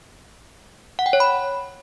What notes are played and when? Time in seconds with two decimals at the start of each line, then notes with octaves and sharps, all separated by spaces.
0.99 F#5
1.06 G5
1.13 C#5
1.20 B5